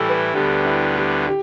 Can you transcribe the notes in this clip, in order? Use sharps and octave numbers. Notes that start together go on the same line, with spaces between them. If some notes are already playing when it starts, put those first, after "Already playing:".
Already playing: A2 E3 G3 E4 G4 A4
B4
D2 D3 G3 B3 G4
E4
G4
G4